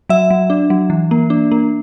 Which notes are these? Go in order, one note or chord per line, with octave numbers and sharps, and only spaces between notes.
F#3 E5
F#3
D4
F#3
E3
A#3
D4
A#3